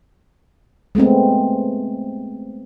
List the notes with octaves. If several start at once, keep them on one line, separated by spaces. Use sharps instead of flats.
G#3 A3 B3 C4